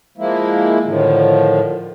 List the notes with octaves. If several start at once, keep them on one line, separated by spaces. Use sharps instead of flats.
F3 G#3 A#3 E4
A2 D3 D#3 F3